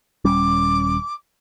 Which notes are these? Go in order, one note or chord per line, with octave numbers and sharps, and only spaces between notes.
D#1 G3 C#4 D6